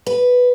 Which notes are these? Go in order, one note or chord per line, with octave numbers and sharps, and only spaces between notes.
B4